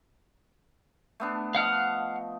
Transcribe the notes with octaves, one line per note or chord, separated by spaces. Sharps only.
A3 B3 D4
F3 D#5 F5 F#5 F6